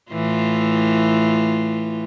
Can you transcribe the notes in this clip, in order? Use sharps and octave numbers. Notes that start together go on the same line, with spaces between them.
A2 E3 F4